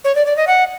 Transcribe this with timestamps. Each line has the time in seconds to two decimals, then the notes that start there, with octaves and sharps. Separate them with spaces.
0.04 C#5
0.15 D5
0.26 D5
0.37 D#5
0.47 F#5